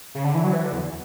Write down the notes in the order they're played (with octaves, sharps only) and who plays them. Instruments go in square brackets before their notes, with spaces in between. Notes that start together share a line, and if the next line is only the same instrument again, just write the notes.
[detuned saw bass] C#3
D3
E3
F#3
E3
D3
E2